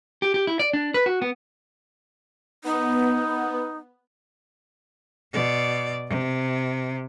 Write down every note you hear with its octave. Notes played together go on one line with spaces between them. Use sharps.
G4
G4
E4
D5
D4
B4
F#4
B3
B3 D#4
B2 D5
C3